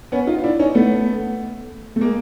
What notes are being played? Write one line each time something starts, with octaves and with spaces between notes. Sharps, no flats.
B3 C#4
D#4 F4
D4 E4
C#4 D#4
A3 B3
A3
G#3 A#3